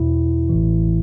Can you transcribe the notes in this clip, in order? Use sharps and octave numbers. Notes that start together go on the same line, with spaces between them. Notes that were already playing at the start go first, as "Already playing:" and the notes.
Already playing: E2 B2 E4
A1 A2 E3